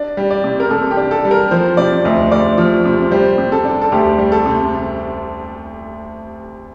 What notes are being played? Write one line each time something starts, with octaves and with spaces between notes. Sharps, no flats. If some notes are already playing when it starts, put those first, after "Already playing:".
Already playing: D4 D5
G3
D5
C3
A#4
C3 A4
G4
D4
A4
G3
A#4
F3 C5
C3 D5
D2 D#5
D2 D5
F3
C3
G3 C5
C3
A4
D4
A4
D2 G4
G3
A4
C3